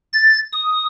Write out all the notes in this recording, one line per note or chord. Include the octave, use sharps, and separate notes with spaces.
A6
D#6